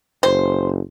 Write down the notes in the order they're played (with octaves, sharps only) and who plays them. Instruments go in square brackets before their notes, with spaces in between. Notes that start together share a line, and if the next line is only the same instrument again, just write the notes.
[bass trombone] F#1 [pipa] C5